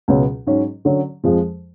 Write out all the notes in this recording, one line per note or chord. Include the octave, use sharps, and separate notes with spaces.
C#2 B2 F#3
G#2 F#3 C#4
D3 F#3 C#4
F2 F3 G#3